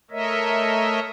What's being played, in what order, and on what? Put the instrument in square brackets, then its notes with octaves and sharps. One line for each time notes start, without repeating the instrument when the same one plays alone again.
[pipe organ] A3 A#4 C#5 D#5 E5